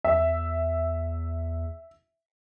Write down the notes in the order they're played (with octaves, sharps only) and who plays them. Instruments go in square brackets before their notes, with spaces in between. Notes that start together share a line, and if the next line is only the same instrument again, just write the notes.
[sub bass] E2 [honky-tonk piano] E5